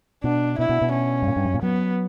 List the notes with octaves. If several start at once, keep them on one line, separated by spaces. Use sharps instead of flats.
B2 D4
B2 E4
B2
B2
C#4
G2
A#2
G2
F#2
A#2
F#3 B3